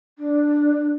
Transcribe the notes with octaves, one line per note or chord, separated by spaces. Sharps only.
D4